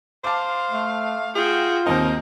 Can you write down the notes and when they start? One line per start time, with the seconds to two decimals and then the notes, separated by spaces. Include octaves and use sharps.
0.24 C5 F5 A5 D6
0.71 A3
1.36 F4 F#4 G#4 G5
1.86 D#2 C4 D#4 A#4 C5